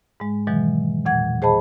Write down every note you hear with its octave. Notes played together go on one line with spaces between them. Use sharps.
G#2 G#3
B2 D#3 E3 F#3 G#3
E2 A#2 F#5 G#6
G#4 C5 D#5 A5 B5